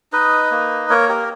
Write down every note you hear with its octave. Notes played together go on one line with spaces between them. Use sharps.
D#4 B4 D#5
A#3
A#3 A#4 C#5
G4 A#4